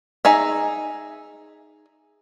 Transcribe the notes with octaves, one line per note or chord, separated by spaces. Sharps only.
D#4 G#4 E5